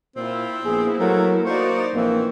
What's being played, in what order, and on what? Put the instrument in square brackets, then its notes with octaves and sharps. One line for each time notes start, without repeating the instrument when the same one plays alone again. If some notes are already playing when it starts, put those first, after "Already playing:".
[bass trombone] A#2 [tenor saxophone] C4 [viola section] E4 F4
[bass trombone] A#1 [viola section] A#3 B3 E4 [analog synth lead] G#4
[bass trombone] F#3 [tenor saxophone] A3 [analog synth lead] A#4
[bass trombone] A#3 [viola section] D#4 F#4 D5 [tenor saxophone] C5 [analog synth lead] C#6
[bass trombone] A#1 [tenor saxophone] E3 [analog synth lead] A#3 [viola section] C4